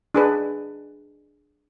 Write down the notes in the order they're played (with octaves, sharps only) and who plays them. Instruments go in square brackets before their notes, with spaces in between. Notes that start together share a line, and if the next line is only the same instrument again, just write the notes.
[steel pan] D4 G#4 B4